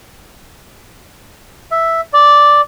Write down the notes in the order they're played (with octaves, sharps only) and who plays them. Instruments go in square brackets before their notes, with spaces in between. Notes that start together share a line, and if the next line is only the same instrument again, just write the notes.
[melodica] E5
D5